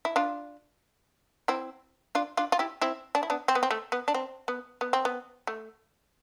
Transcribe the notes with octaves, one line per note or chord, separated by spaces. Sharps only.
E4
D4 F4
C4 E4
D4 F4
D4 F4
F4
E4 G4
C4 E4
D4
E4
B3 D4
C4
B3
C4
A3
B3
D4
C4
B3
B3
C4
B3
A3